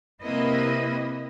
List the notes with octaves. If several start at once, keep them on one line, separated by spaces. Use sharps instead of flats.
C3 A#3 C4 E4 B4 D#5